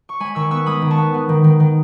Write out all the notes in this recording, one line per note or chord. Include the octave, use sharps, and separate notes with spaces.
C#6
G#3 G#5 B5
D#3 C#6 E6
B3 C#6 E6
G#3 B5 D#6
D#3
A5 C#6
B3
B3
D#3
D#3
D#3